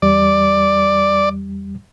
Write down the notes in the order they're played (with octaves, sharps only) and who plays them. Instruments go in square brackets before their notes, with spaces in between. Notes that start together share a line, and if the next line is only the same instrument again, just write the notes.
[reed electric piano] E2 G3 [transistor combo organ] D5